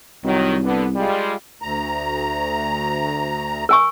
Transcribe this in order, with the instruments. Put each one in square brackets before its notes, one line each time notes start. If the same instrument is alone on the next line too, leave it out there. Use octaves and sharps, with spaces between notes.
[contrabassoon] C2 [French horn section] D#3 F#3
[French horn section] D3 B3
G3 G#3 F4
[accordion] D2 A#5
[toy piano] A#4 G#5 C#6